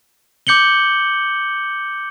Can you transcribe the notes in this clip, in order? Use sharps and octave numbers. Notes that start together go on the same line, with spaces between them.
D6 G6 C#7 F#7 G7